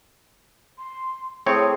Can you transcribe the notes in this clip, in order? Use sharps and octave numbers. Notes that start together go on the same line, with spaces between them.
C6
A2 C4 G#4 C#5